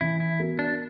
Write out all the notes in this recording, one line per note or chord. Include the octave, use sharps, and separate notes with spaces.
E3 E4
E4
B3 F#4 A#4
D4